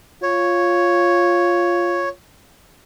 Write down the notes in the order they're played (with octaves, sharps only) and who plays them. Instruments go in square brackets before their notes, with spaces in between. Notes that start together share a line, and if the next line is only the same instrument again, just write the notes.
[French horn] F4 [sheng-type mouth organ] C#5